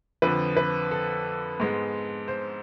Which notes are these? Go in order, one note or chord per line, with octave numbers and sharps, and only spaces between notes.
F2 D3 F3 B4
B4
A4
G#2 G#3 B3
C5